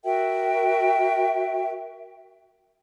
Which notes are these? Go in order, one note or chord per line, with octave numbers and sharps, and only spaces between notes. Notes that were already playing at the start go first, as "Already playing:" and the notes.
F#4 A#4 E5 G5